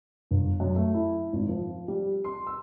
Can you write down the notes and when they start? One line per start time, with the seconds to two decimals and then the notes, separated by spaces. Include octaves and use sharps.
0.31 G1
0.60 F#2
0.76 A3
0.94 E4
1.33 G#1
1.49 F3
1.88 G3
2.24 C6
2.47 E6